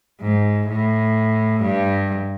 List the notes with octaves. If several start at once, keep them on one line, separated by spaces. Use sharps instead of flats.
G#2
A2
G2